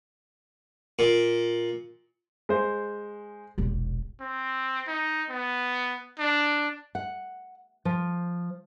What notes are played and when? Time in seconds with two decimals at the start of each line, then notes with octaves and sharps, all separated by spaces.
0.99 A#2
2.49 G#3 C5
3.58 E1 A#1
4.21 C4
4.87 D#4
5.30 B3
6.19 D4
6.95 F#5
7.85 F3